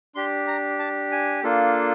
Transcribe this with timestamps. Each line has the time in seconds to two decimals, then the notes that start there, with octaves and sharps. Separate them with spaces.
0.15 D4 G4 C6
0.47 A#5
0.79 A5
1.12 G#5
1.44 A#3 D4 F4 A4